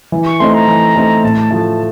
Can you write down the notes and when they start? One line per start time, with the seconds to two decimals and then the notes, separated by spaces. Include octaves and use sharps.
0.12 E3
0.26 C#6
0.39 A3 C4 D#4 C6
0.54 A#5
0.67 E3
0.96 A3 C4 D#4
1.23 A2 A5
1.51 F3 A3